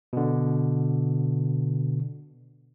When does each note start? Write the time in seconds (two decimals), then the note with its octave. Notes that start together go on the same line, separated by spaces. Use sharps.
0.13 B2 D3